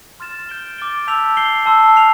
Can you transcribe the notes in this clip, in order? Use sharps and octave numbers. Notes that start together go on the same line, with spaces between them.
C6 F6 A6 E7
G6 D7 G7
D6 F6 A6 D7 G7
A5 E6 G6 B6 F7
G6 C7 G7
A5 C6 E6
F6 C7 F7